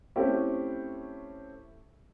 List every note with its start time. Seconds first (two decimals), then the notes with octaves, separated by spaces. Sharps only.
0.16 A3 C4 C#4 E4 G4